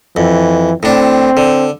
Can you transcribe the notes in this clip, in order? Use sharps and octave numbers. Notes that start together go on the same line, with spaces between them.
F2 E3
A2 C4 D4
D3